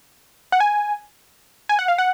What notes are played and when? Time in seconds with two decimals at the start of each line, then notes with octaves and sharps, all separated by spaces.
0.52 F#5
0.60 G#5
1.69 G#5
1.79 F#5
1.88 F5
1.98 F#5